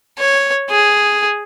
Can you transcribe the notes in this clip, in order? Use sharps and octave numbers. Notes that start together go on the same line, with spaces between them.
C#5
G#4